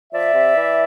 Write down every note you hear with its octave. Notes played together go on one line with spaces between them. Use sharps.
F3 D5 E5
C3
E3